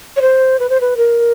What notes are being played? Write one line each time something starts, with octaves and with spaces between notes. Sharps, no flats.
C#5
C5
B4
C5
B4
A#4